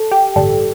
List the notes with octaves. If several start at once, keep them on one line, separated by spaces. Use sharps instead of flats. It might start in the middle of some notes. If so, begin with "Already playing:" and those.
Already playing: A4
G4
A1 G2 D3 G3 A4